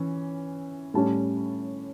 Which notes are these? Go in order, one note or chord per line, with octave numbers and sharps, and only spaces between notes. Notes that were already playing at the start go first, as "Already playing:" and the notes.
Already playing: E3 C#4
A2 G3 C#4 A5